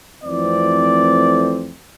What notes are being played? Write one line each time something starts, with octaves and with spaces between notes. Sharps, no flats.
F2 E3 A3 C4 D5